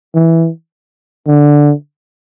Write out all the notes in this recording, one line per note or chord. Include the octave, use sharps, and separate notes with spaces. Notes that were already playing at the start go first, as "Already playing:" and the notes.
E3
D3